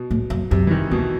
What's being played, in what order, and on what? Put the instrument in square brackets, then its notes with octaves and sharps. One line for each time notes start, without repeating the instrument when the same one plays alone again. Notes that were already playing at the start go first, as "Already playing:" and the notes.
Already playing: [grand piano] B2
[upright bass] A2
F#2
[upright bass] F#2 [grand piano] C3
[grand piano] E3
D#3
[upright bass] E2 [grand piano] B2